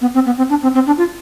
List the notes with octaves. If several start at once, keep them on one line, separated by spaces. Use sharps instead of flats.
B3
C4
B3
C4
D4
C4
C4
D4
F4